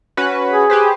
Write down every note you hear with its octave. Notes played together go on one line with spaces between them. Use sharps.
C#4 F#4 B4
G#4
G4 B4 C5